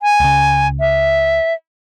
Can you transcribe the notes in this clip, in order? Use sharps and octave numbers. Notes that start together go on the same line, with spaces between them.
G#5
C#2 C#3
E5